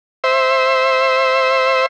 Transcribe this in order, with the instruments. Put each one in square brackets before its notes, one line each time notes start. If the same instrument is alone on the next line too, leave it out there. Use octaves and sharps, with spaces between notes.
[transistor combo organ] C5 E5